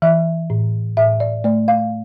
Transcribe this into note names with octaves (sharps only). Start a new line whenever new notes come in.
E3 E5
A2
A2 E5
D5
A3 D5
F5